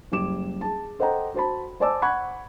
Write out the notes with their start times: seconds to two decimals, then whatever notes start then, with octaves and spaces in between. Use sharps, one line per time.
0.12 F#1 G3 D6 E7
0.61 G#4 A5
0.99 A4 C5 D#5 F#5 G5 A#5
1.34 F#4 C5 A5 B5
1.80 C5 D5 G#5 A5 D6 E6
2.02 F#5 B5 C#6 F#6 G#6